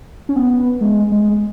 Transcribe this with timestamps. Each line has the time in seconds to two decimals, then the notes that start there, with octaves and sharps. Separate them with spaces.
0.29 C#4
0.36 B3
0.81 G#3
1.12 G#3